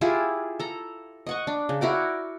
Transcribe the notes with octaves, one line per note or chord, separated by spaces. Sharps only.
E4 F4 G4 G#4
A4 A#5
D#5 F#5 C#6
D4
C#3
E4 F#4 A#4 D5